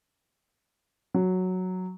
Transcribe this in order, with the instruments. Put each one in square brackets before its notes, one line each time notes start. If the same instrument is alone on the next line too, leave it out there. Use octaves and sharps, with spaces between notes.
[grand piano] F#3